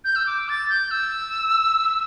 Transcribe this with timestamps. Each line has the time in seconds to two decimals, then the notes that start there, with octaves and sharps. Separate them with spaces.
0.04 G6
0.16 E6
0.26 D6
0.49 A6
0.69 G6
0.91 E6